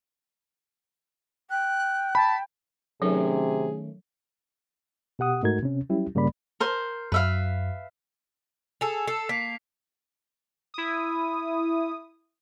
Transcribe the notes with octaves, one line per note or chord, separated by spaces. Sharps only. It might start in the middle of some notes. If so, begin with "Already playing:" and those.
G5 F#6
A5 B5
C3 D#3 F#3 A3 C#4 G#4
B2 G4 F#5 D#6
G#2 A3 D#4 F#4 A#4 G#6
C3 C#4
F#3 G3 C#4 E4 G4
G2 C#3 G3 A#3 D5 B5
A#4 C5
F#2 B4 E5 F5
G#4 A4 F7
A4 C7
A#3 B6 C7
E4 D#6